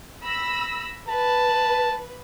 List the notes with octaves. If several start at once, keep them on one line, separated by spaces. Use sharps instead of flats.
B5 E6 A#6
B4 A5